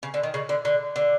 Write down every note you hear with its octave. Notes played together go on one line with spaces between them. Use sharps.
C#3
D3
D#3
C#3
D3
D3
D3